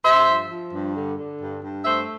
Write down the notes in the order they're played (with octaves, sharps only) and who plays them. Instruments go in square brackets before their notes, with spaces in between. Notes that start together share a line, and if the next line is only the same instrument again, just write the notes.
[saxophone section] G2 C5 E5
F3
F3
G2
D3
D3
G2
G2
A3 C5 E5